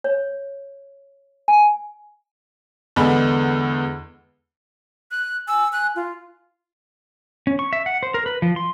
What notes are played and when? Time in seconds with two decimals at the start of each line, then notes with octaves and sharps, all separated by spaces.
0.04 C#5
1.48 G#5
2.96 E2 D3 G#3 B3 G#4 B5
5.11 F#6
5.48 G#5 E6
5.73 F#6
5.96 F4
7.47 C#4
7.59 C#6
7.73 E5
7.86 F#5
8.03 C5
8.14 A#4
8.26 B4
8.42 F3
8.56 C6